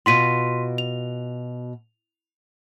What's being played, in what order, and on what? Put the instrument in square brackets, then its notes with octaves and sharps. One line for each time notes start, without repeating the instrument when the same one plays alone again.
[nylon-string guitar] B2 F4 F#4 [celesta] C6 B6 D#7
[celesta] F7